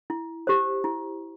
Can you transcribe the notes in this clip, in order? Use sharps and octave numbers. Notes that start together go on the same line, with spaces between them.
E4
G4 C5
E4